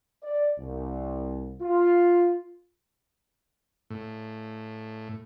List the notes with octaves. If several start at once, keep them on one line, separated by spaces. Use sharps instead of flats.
D5
C2
F4
A2